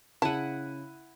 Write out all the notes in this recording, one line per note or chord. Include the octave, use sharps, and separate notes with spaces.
C#3 E4 F#5 A5 D#7